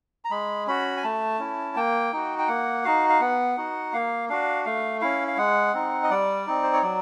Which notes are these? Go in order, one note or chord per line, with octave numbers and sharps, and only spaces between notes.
A#5
G#3 B5
C#4 F#4 B5
G#5
A3 A5
C#4 E4
A#3 G5
D#4 F#4
G5
A#3 F#5
D#4 F#4 F5
F5
B3 F#5
D#4 F#4
A#3 F5
D4 F#4 F5
A3 F5
C#4 E4 F5
F5
G#3 F#5
C4 D#4
D#5
G3 D5
C4 D#4
C5
C#5
F#3 D5